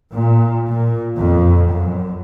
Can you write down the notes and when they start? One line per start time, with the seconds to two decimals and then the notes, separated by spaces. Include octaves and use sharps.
0.14 A#2
0.70 A#2
1.18 F2
1.69 F#2